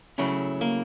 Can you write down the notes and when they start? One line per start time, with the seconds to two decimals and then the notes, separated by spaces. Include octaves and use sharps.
0.18 C#3 F#3 A3 C#4 E4
0.61 A#3